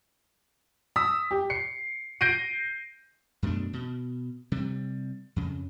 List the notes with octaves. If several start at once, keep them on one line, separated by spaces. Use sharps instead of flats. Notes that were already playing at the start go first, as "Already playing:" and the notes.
D#6 E6 B6
G4
C7 C#7
G6 A#6 C7 D7 D#7
F#2 B2 A3 D4
B2
C3 G3
F2 C#3